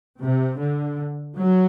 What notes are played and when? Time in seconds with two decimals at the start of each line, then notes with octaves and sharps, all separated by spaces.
0.20 C3
0.59 D3
1.37 F#3